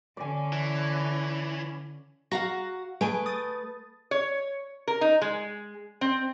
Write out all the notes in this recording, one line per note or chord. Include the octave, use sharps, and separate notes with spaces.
D3 C#4 D5 G#5
E3
F#4 F5 F#5 A#5 A#6
A3 G#4 B4 G#5 D7
D#6 A6
C#5
A#4
D#4
G#3
C4